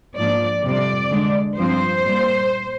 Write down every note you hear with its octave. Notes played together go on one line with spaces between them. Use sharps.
G#2 F3 A#3 D4 D5
F2 C3 G3 C4 D5
D3 G#3 D4
G2 F3 C4 C5
A#2 G3 A#3